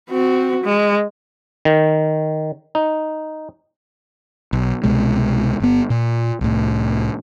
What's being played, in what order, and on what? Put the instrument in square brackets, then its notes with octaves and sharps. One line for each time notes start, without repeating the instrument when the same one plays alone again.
[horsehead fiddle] C4 F#4
G#3
[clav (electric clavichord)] D#3
D#4
[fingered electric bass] B1
C2 B2 G#3
G1 B3
A#2
C2 A2